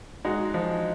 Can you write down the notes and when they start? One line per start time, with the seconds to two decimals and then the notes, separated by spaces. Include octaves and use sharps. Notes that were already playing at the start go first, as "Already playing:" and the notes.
0.25 G#3 D#4 F#4
0.54 F3 D#4